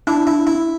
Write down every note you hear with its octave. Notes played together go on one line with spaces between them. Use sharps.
D4 E4
E4
E4